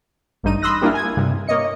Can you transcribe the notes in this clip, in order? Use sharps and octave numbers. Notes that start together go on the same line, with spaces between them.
A1 G2 D#4 D#7
B5 C6 D#6 E6 F#6 A#6
G3 A#3 D4 E4 F4
G#5 G#6
G2 C3
A#3 C#5 D#5 C#7